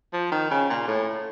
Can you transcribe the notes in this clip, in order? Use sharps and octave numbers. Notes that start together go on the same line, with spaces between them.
F3
D#3
C#3
A#2
A2